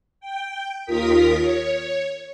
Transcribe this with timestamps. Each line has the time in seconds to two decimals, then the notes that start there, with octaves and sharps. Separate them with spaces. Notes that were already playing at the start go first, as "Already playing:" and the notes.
0.21 G5
0.85 D#2 F4 A#4 D#6 B6
1.39 C#5